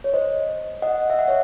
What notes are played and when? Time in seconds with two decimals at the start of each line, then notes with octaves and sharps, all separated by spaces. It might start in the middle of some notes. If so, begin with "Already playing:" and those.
0.04 C#5
0.13 C5 D#5
0.82 D#5 F#5
1.10 E5
1.19 F#5
1.28 C#5 E5